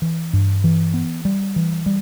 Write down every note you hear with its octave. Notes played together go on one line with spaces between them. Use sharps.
E3
G2
E3
B3
G3
E3
G3